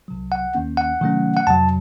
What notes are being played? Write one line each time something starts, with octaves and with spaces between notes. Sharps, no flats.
C2 C3 F#3
F#5
D#2 D#3 A#3 C#4
F#5
C3 D#3 F#3 A3 C#4
F#5
F2 C3 F#3 A5